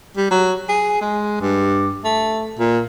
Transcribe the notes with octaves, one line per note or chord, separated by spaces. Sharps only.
G3
F#3
G#4
G#3
G2
A3
A#2